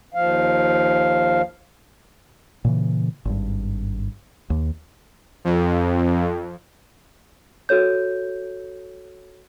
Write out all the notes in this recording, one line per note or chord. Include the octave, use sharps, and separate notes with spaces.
D#2 F3 F5
A#2 C#3 E3
G#1 G2
D#2
F2
F#4 A4 C#5 G6